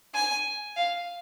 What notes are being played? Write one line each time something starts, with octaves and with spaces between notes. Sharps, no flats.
G#5
F5